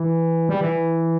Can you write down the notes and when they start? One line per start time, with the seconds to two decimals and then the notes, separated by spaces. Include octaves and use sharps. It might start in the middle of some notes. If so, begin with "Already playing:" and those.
Already playing: E3
0.49 G3
0.61 E3